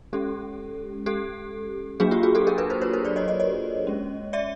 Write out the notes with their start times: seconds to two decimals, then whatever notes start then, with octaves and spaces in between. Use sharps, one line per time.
0.13 G#3 C#4 G4 A4
1.06 G4 A4
2.00 F#3 A#3 D4 F#4 G#4
2.11 F4 G4
2.23 F#4 G#4
2.35 G4 A4
2.47 G#4 A#4
2.58 A4 B4
2.70 A#4 C5
2.81 B4 C#5
2.93 A#4 C5
3.05 C5 D5
3.16 C#5 D#5
3.28 C#5 D#5
3.40 C#5 D#5
3.87 G#3 C#4
4.33 D5 E5